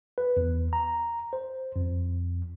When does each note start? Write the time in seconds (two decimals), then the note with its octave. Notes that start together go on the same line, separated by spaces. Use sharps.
0.18 B4
0.37 E2
0.73 A#5
1.33 C5
1.76 F2